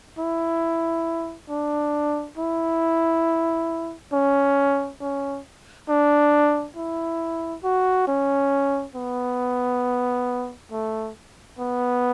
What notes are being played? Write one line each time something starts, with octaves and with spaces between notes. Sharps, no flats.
E4
D4
E4
C#4
C#4
D4
E4
F#4
C#4
B3
A3
B3